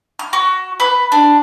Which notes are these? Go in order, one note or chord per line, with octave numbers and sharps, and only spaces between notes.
F6
F#4
B4
D4